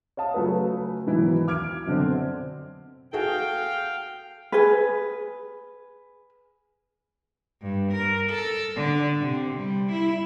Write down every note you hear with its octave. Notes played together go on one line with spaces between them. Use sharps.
C#5 F5 A5 D#6
C#3 F#3 A3 F4 B4
G#2 B2 D#3 E3 F#3 E4
D6 F6 G#6 D7
F#2 B2 D3 C4
F#4 G#4 A4 F5 G5
G#4 B4
G2
A#4
A4
D3
C3
G3
E4